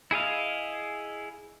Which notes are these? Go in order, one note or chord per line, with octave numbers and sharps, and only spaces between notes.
E4 G#4 D#5 F5